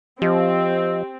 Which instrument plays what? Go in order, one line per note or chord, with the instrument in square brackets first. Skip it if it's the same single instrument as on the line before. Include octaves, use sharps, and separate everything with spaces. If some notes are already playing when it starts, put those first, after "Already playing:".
[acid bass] F3 [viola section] C4 [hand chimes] G4 [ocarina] D#5